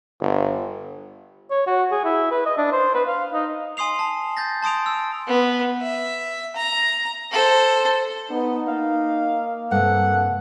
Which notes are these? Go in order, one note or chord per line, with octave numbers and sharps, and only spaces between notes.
G1
C#5
F#4
G#4
E4
B4
D#5
D4
C5
B4
F5
D#4
G#5 C6 D#6 C7 F7
A5
G6 A6 A#6
A5 C6 D#6 D7 F7
E6
B3
E5
A#5
A4 C5
B3 D#4
A#3 F5
G2 C3 A4 F#5